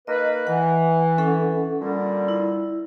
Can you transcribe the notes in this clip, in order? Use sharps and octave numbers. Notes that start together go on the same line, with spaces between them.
A#3 D#4 B4 D#5
E3 F#5
C#4 A4 F#5
A#2 D3 G3
E4